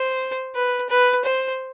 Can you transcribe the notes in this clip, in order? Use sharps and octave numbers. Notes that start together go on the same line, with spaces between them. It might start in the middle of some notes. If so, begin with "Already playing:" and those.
Already playing: C5
B4
B4
C5